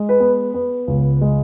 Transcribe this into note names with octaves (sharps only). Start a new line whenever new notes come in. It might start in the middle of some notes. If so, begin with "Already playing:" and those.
Already playing: G#3
B4
B3
B3
C#2
G#3